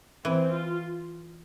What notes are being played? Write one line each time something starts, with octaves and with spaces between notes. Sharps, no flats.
E3 C4
F4